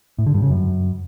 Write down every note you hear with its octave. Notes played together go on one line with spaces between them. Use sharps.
A2
D3
G2
C#3
F#2